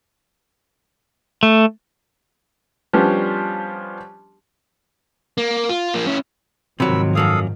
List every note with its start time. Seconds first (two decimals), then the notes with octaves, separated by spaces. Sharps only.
1.43 A3
2.93 F3 G3 B3 C#4 D4 G4
5.38 A#3
5.69 F4
5.94 F3 A#3
6.07 C#4 E4
6.80 G#2 C3 D#3 F3 F#3 B5 E6
7.15 F#2 F#3 A#3 A4 F5 D#6